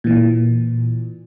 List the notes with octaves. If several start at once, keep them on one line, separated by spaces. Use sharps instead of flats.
A#2 E3